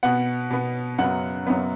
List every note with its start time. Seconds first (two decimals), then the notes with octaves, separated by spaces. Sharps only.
0.03 B2 B3 F#5
0.50 B2 B3
0.98 F#2 C#3 F#3 B3 F#5
1.47 F#2 C#3 F#3 B3